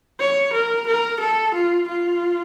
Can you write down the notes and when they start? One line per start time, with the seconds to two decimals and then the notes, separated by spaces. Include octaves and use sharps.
0.20 C#5
0.53 A#4
0.87 A#4
1.20 A4
1.54 F4
1.88 F4